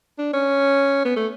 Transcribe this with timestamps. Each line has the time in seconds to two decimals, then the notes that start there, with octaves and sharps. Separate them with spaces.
0.19 D4
0.33 C#4
1.05 B3
1.16 A3